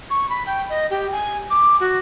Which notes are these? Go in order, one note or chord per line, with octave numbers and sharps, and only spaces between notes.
C#6
B5
G5
D#5
G4
G#5
D6
F#4